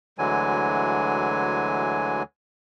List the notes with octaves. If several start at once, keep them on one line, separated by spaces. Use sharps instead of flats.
D2 D3 E3 F#3 G#3 G#5